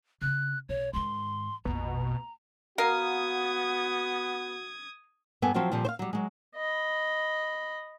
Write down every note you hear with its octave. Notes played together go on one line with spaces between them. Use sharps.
C#3 C4 F#6
B1 C#5
G#2 D#3 C6
A#1 F2 B2 A#5
B3 F#4 A#4 F5 D#6 G#6
G2 B3 A4 G#5
F3 F#3 C4 F4 F#4
A#2 D3 F3 G3
C5 F5
F#3 G3
F#3 G#3
D#5 B5